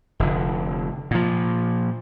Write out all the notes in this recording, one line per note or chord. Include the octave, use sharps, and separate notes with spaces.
F1 D3
A#2 F3